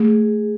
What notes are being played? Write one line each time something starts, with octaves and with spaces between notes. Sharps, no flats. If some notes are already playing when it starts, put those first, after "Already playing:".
Already playing: A3 G#4